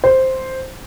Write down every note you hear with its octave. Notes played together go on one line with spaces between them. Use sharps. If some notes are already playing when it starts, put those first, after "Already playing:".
C5